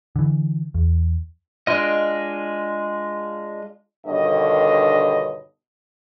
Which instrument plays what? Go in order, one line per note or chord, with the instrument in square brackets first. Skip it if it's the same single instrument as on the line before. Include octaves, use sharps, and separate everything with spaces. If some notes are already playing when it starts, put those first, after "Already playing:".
[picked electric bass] D3 E3
E2
[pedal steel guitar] G#3 D4 F4 D#5
[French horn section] G2 B2 D3 D#3 C#5 D#5